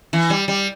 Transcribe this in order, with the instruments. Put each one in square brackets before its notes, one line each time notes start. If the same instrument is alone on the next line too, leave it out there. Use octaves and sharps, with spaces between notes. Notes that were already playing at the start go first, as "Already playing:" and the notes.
[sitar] E3
G3
G3